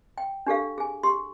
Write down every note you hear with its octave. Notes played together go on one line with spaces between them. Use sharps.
G5
D4 G4 A4 F5
G#4 G#5
G4 C6